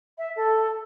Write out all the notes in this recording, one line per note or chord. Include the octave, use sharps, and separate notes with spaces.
E5
A4